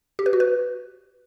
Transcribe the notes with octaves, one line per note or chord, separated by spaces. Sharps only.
G4
B4
F#4
B4